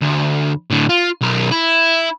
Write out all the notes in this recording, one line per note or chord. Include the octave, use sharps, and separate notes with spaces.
D2
A2 D3
F4
B1 A#4
E4